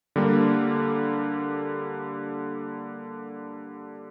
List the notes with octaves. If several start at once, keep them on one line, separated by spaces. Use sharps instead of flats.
D3 G3 A#3